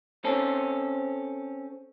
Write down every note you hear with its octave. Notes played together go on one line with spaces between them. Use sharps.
C4 C#4 A4